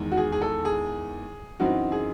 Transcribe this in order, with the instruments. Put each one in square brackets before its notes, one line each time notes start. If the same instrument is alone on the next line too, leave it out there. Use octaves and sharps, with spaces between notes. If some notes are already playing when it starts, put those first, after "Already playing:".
Already playing: [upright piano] E2 D#3 G#3
F#4
G#4
G#4
A4
G#4
F#2 E3 C4 D#4 F#4
G#4